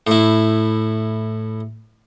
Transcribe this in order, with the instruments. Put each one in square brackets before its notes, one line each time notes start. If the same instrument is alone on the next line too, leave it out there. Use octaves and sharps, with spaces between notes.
[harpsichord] A2 E4